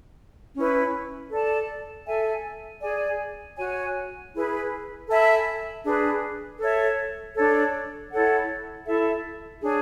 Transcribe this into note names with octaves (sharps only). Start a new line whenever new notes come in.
C#4 E4 B4
A4 D5 A5
A4 E5 G#5
G#4 D5 G#5
F#4 C#5 G#5
E4 G#4 B4
A4 E5 G#5 B5
D4 G#4 B4
A4 C#5 E5
D4 A4 C#5
E4 A4 C#5 F#5
E4 A4 E5
D4 G#4 C#5 G#5